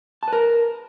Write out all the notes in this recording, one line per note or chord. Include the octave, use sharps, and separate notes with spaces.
A#4 B4 A5